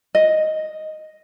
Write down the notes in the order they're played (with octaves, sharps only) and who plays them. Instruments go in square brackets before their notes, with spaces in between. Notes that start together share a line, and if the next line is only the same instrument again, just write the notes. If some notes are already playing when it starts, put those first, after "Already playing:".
[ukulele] D#5